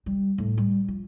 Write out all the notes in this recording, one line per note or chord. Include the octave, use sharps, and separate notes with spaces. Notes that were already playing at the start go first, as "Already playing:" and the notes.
G3
A2
G3
F3